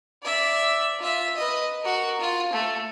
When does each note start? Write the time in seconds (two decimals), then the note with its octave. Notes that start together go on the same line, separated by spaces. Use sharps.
0.23 D5 E5
0.99 F4 E5
1.35 B4 D#5
1.82 F#4 A#4
2.20 F4
2.53 A3